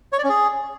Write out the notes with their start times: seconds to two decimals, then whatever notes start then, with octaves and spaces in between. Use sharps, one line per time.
0.13 C#5
0.18 D5
0.24 C#4
0.29 G#4